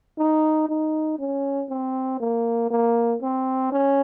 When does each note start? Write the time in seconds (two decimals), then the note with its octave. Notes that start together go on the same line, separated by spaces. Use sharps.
0.18 D#4
0.69 D#4
1.19 C#4
1.70 C4
2.20 A#3
2.71 A#3
3.22 C4
3.72 C#4